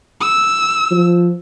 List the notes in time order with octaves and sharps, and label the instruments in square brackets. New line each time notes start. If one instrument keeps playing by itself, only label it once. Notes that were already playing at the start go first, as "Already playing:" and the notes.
[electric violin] E6
[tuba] F3